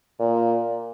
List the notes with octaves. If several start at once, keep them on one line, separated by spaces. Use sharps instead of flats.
A#2